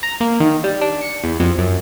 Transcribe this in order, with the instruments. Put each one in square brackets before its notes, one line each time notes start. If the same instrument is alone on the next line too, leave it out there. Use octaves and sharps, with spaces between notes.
[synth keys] A#5
A#3
D#3
G3
D4
C#7
E2
F2
F#2